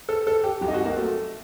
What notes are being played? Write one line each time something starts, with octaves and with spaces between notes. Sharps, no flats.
A4
A4
G4
C2 C3 F#3 G4
D#4
F#4
A#3
A3